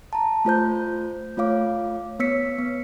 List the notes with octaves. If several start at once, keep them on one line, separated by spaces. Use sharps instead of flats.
A5 A#5
A3 F4 C5 G6
A3 F4 C#5 F5 D6
B3 C#5 E6 B6 C#7
B3